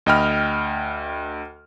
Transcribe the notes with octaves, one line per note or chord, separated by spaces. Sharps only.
D2 D#5 G5 B5 F6